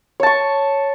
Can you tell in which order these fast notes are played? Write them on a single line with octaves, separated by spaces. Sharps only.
C#5 A5 C#6